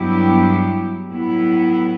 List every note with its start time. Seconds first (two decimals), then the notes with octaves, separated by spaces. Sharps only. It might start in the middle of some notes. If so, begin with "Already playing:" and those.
Already playing: G2 F#3 B3 E4 G4
1.09 A2 F#3 B3 E4